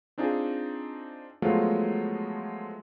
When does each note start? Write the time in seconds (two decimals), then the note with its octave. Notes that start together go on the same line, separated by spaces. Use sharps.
0.18 C4 D4 D#4 F4 G#4
1.42 F3 F#3 G#3 A3 B3 F4